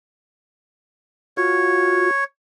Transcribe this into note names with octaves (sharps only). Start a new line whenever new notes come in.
F4 F#4 C#5